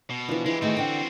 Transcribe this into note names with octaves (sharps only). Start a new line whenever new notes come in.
B2
E3 F3 D4
E3 G#3 E4 G4
D#3 A3 C4 F#4 G#4
D3 G5